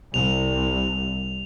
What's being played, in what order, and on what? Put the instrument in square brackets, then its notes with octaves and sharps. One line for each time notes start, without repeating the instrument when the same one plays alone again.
[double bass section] C2 [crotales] F7